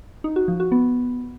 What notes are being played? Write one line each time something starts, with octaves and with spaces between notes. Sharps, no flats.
D#4
F#4
F3
F#4
B3